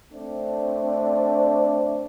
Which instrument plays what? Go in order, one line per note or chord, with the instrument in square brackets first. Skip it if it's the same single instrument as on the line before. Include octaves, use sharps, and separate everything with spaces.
[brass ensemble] A3 C4 D4